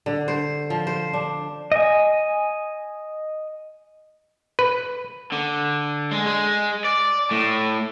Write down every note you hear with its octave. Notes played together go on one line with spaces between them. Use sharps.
D3
C5
F3
C5
D4
D#5 G#5
B4
D3
G#3
G#3
D5
A2